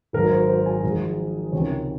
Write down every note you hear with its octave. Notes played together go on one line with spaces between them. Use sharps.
G#1 G#2 F#3 A#4
C5
C5
G#5
G#1 G#2 F3 G#3
C#2 C3 D#3 C#5